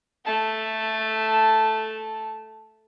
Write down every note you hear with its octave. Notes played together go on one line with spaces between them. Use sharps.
A3 A5